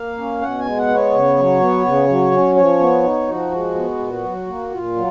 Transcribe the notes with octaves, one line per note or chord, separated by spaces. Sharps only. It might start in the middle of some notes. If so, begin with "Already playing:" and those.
Already playing: A#3 F5
C#4
B2 F#5
G#5
G#3
F#5
B3
C#5
C#3
F#3
B3
C#3
F#3
C#4
F3 C#5
B3
D#4
F3 F#4
G#3
B3
A#2
F#3
A#3
A#2 F4
F#3